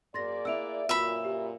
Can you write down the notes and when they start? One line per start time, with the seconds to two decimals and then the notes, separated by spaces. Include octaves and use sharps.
0.14 F#2 A#3 G#4 C5 D5 C6 A6 A#6
0.45 E4 F#5 E6 D7 F7
0.89 F#2 A#2 F4 F#4 B4 E5 B5
1.25 G4